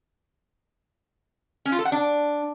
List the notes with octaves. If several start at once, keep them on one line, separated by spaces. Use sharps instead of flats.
C#4
F4
A4
F#5
D4